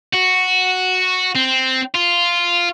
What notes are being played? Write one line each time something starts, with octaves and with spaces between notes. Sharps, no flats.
F#4
C4
F4